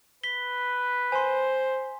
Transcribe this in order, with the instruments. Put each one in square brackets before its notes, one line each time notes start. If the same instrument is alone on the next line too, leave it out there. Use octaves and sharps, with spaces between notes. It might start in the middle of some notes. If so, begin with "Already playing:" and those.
[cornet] B4 [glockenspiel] B6 G7
[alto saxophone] C5 [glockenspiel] G#5 C6